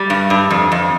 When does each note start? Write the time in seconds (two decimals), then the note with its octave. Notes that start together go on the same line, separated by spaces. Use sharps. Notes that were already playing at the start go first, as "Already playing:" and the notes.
Already playing: G3
0.10 G2
0.30 G2
0.51 F2
0.72 F2